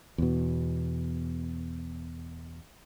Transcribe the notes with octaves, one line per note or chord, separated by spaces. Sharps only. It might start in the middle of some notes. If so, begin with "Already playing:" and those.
E2 B2